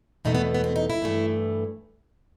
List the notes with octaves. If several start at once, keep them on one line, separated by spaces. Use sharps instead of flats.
E2 B2 A3 D#4
B3
B3
C4
D#4
E4
G2 E3 A3